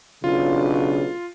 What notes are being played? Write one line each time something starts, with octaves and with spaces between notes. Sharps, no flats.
B1 C#3 D4 F4